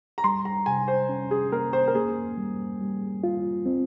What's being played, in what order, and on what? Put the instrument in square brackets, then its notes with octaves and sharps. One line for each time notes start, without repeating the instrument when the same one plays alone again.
[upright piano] A#5
[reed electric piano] G3 [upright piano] C6
[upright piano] A#5
[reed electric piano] C3 [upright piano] G#5
[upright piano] C5
[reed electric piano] C#4
[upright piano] G#4
[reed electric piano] A#3 [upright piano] A#4
[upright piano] C5
A#4
[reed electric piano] A#3 [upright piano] G#4
[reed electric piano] G3
G3
F4
C4